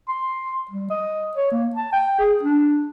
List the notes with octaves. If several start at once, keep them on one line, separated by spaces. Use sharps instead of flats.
C6
G3
D#5
C#5
A#3
A5
G5
G#4
D4